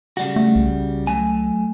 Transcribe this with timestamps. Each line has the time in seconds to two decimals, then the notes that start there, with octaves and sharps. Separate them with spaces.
0.17 C#3 G3 F#4
0.36 A3
0.56 C2
1.07 F#3 A3 G#5